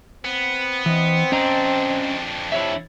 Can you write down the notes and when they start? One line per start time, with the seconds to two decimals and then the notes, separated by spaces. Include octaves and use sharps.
0.25 B3 C4
0.86 E3 C4 D#5
1.32 F2 C#4 D4 D#5 A#5
2.52 C3 E4 C#5 E5